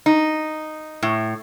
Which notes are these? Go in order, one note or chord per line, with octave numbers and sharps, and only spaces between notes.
D#4
A2